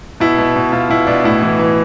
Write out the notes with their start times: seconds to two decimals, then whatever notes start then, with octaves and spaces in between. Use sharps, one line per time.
0.20 B2 E4
0.38 B2
0.56 B2
0.72 B2 F4
0.90 B2 E4
1.07 B2 D4
1.24 A2 E4
1.42 E3
1.59 E3